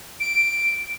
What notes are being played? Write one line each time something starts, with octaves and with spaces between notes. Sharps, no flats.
D7